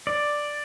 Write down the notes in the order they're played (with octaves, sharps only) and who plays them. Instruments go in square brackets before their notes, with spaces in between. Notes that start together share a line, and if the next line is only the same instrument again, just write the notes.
[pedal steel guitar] D5